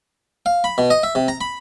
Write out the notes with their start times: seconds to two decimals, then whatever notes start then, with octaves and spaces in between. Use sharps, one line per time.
0.46 F5
0.64 B5
0.78 B2
0.90 D#5
1.03 E5
1.15 C3
1.28 A#5
1.41 B5